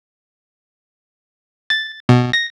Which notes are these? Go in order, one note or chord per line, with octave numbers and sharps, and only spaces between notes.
A6
B2
A#6